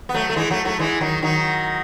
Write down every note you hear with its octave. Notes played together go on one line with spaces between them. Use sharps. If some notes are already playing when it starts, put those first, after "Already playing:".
B3
F#3 A3
A3
E3 G#3
F#3 A3
F#3 A3
E3 G#3
D#3 F#3
D#3 F#3